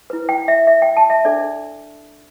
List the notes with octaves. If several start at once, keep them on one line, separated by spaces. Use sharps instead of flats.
E4 B4
G5
E5
E5
G5
A5
E5
D4 A4 D5